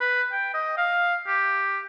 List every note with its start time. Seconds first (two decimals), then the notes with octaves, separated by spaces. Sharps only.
0.01 B4
0.32 G5
0.54 D#5
0.77 F5
1.27 G4